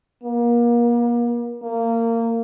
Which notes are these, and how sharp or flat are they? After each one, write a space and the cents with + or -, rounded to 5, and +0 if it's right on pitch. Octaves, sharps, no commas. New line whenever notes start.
A#3 +35
A#3 -25